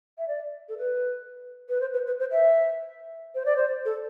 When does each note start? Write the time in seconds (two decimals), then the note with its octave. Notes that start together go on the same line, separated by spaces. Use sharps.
0.18 E5
0.28 D5
0.69 A4
0.78 B4
1.69 B4
1.81 C5
1.93 B4
2.07 B4
2.20 C5
2.32 E5
3.35 C5
3.46 D5
3.57 C5
3.85 A4